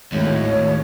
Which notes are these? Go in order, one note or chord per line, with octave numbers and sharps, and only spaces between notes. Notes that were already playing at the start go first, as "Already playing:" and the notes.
G#1 D#2 A2 C#5